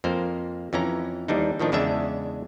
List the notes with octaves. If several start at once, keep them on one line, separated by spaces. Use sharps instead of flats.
F2 A#3 C5
F2 E3 C#4 A#5
D#2 E3 G3 D4 D#4
A2 D#3 F3 D4
E2 C#3 G#3 D4 E5